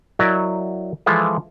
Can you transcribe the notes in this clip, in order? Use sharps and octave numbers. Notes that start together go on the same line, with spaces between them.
F#3 E4 A#4 D5 D#5
E3 F3 G#3 E4 F4 A4